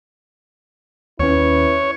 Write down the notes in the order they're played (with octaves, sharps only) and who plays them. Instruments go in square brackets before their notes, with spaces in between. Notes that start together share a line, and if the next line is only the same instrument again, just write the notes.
[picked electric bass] D#2 C#4 [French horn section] E4 B4 [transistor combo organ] C#5